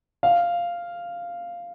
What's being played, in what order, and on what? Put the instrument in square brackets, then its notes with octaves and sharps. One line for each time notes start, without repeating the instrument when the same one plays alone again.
[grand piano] F5